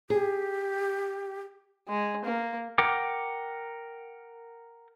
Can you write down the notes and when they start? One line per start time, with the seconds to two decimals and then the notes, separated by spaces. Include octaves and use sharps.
0.10 G4 G#4
1.89 G#3
2.25 A#3
2.78 A#4 F#5 G5 D6